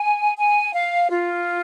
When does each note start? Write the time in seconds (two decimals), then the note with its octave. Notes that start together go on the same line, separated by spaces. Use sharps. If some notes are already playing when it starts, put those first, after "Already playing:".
Already playing: G#5
0.37 G#5
0.74 F5
1.10 F4